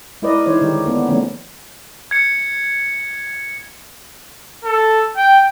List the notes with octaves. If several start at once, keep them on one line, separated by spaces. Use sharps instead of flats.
G#3 E4 A#4 B4 D5 D#5
E3 D#4 E4 C5 C#5
D3 D#3 G#3 G4
A#3 B3 D4
D3 F3 A3 B3 C#4 D4
G#6 C#7
A4
G5